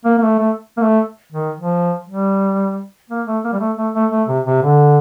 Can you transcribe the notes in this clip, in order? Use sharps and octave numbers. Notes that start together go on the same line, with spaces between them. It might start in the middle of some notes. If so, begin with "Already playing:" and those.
A#3
A#3
A3
A3
A#3
A3
D#3
F3
G3
A#3
A3
A#3
G3
A3
A3
A3
A3
C3
C3
D3